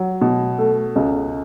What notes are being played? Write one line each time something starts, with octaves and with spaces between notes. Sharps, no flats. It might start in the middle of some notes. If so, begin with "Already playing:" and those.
Already playing: F#3
B2
A3
C#2